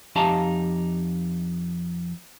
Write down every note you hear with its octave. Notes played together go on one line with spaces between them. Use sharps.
F2 D#4 G4 F5 A5 A#5